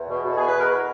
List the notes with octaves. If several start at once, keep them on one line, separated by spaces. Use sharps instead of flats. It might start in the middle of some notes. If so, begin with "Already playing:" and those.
Already playing: E2
B2
B2
A4
G#4
E2
B4
B2 A#4